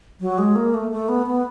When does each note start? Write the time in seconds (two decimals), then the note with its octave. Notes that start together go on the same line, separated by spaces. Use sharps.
0.21 F#3
0.38 G#3
0.56 A#3
0.74 A3
0.91 A3
1.09 B3
1.27 B3